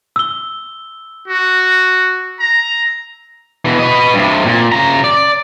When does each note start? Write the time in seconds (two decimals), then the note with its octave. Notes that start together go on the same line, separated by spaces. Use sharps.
0.16 E6 G7
1.28 F#4
2.40 A#5
3.65 B2 E3
3.79 B4 D#5
4.14 G2 C3
4.45 A#2
4.72 C#3 A#5
5.04 D5